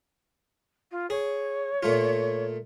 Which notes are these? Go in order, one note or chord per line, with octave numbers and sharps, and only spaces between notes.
F4
G#4 C#5
A#2 A3 F4